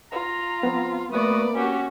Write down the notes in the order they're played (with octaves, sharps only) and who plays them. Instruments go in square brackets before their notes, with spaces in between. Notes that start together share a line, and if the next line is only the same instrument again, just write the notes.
[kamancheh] F4 [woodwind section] A#5
[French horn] F3 [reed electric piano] B3 C4
[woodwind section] A3 F#4 D#6 [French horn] A#3 [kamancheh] B4 D5
[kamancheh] C#4 F#4 [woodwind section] G4